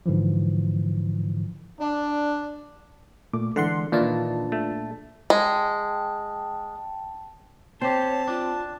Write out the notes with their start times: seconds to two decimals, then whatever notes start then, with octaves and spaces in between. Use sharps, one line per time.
0.06 G#2 D3 E3 F3
1.79 D4
3.34 A#2 A3 D6
3.56 D3 E3 G#3 A4 F#5 C6
3.92 A#2 D#3 E3 D4 F4 B4 A5
4.52 A3
5.30 G#3 G5 A5
7.81 C4 G4 C5 C#5 A5
8.28 D4 F4